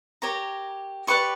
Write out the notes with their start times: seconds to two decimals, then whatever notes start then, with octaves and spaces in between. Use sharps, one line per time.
0.22 G4 A#4 C#5 A#5
1.07 G4 B4 D5 C#6